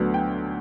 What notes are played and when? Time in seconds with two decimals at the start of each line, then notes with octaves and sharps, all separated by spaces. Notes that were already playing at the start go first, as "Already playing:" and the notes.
Already playing: D2 D3 F#3 B3
0.14 G5